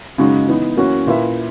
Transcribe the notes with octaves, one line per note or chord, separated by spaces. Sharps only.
F#2 C#3 G#3 D#4 F#4
E3 B3 D#4
F#2 E3 A#3 C#4 F#4
A#2 A#3 E4 B4 E5